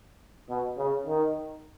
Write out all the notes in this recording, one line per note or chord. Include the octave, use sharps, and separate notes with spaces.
B2
C#3
D#3